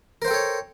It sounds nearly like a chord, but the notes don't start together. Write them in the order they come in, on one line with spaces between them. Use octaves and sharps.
A#4 C5 G5 A4 C#5